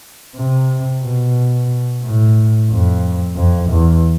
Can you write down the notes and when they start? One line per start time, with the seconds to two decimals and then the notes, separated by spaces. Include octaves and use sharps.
0.36 C3
1.03 B2
2.03 A2
2.70 F2
3.36 F2
3.70 E2